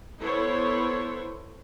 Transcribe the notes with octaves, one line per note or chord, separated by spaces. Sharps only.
B3 E4 A4 C5 C#5